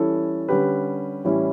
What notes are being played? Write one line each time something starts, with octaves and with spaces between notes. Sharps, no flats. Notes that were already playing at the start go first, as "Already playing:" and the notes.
Already playing: E3 G3 C#4 E4 A4
D3 G3 C#4 G4 B4
A2 E3 G3 C#4 E4